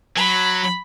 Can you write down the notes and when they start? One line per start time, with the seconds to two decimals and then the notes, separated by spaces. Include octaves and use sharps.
0.17 F#3 B5